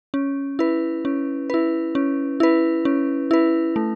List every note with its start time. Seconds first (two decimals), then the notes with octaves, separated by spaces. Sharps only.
0.14 C#4
0.59 E4 B4
1.05 C#4
1.50 E4 B4
1.95 C#4
2.40 E4 B4
2.85 C#4
3.31 E4 B4
3.76 A3